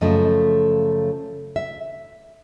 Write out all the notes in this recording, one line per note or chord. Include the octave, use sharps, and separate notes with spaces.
F#2 C#3 F3 A3 D#5
E5